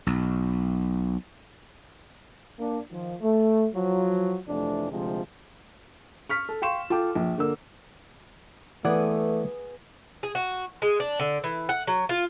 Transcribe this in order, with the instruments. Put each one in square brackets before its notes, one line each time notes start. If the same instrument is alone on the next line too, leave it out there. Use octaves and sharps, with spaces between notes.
[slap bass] B1
[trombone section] A#3 D4
D#3 F3
A3
F3 F#3
F2 C3 E3 A3 D4
D2 C3 F3 G#3
[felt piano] C#6 F6 B6
A4
F5 G5 C6 C#6 E7
F4 A4 G5 D6
A#1
D3 A#3 E6
[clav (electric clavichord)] E3 D5 F#5 [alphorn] A3 [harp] B3 G#4
[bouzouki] G#4
F#4
G#3
D4
D3
E3
F#5
F#3
F4